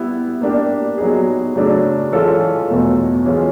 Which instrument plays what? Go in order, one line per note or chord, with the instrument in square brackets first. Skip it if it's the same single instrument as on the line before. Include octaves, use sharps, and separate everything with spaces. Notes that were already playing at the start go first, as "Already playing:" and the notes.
Already playing: [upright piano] G3 B3 E4
A#3 D4 G4
F#3 B3 D#4 G#4
C#3 F#3 A3 D4
E3 G#3 C#4 F4 A4
E2 B2 F#3 A3
E3 G#3 C#4 F4